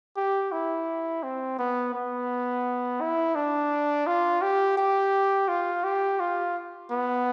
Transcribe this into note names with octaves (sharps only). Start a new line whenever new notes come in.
G4
E4
C4
B3
B3
E4
D4
F4
G4
G4
F4
G4
F4
B3